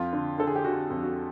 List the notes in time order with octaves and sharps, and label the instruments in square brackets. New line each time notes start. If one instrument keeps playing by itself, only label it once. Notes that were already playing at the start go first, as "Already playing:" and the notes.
Already playing: [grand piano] F2 F4
D3
D3 A4
G#4
G4
D3 F#4
F2
F#4